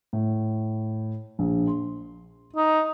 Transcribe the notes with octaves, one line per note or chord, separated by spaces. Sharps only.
A2
A#1
C6
D#4